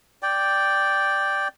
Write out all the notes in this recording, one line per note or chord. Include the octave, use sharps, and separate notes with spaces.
D5 G5